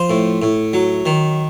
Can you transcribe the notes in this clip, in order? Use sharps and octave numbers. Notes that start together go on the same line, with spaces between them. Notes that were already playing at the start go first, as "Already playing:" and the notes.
Already playing: F3 C5
A2
A2
F#3
D#3